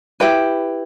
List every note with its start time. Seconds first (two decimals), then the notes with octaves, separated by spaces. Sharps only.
0.20 E4 G4 B4 G5